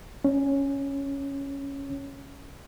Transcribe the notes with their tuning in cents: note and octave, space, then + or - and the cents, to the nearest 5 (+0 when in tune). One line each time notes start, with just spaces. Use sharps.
C#4 +0 C#5 +0